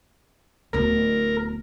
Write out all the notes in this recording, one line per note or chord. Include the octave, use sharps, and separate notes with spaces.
D1 B3 A#4